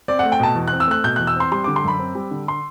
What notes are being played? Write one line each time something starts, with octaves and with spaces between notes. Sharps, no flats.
C4 D5
A3 F#5
G5
B2 A5
E2
C4 F#6
E6
A3 F#6
B2 G6
E2 F#6
E6
C4 C6
G3 C6
D3 D6
C6
F#2 B5
C4
G3
D3
C6